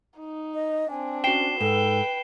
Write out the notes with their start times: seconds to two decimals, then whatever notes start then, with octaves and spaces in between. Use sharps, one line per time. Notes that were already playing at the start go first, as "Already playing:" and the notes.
0.19 D#4
0.54 D#5
0.90 C4 D4 G#5
1.24 C#4 F#4 G5 C7 E7 G7
1.61 G#2 A4 B4 G5 E7